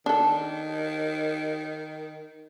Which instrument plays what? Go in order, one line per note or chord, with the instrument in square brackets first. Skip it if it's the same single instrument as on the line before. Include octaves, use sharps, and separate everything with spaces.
[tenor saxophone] D#3 [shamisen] D4 A4